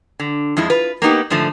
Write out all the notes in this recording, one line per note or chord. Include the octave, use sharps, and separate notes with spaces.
D3
F2 G#3 E4 F4
F4 B4
A#3 B3 D#4 G4
G#2 D3 F3 A3